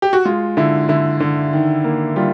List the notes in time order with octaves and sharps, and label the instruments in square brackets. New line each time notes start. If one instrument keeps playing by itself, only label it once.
[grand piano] G4
F#4
G#3 F4
D3 E4
D3 E4
D3
D#3
A#3
G3 F4